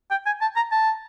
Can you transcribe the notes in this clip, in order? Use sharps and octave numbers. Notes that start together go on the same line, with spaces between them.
G5
G#5
A5
A#5
A5